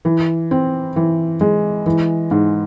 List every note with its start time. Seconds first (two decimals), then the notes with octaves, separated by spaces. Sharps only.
0.05 E3
0.51 C4
0.96 E3
1.41 G#3
1.86 E3
2.31 G#2